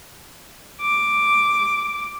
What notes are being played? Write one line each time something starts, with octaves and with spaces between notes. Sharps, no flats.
D6